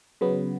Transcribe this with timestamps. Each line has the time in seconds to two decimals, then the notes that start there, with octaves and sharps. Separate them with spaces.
0.21 C#3 F#3 B3